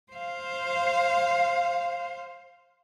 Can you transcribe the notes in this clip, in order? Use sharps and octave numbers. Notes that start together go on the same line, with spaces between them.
C5 F5